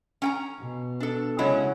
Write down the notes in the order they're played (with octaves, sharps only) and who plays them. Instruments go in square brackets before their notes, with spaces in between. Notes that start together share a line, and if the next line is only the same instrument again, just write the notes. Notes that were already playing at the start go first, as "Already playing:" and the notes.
[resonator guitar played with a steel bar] C#4 G5 A#5
[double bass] B2
[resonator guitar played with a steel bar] D4 A4
[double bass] C#3 C#4 [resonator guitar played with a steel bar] F#3 G#3 E4